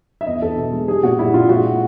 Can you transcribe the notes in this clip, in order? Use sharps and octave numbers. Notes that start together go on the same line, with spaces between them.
E5
E2 D#5
E2 A4
B2
G#3
G3 G#4
A#2 F#4
G3 E4
A#2 F4
G#3 F#4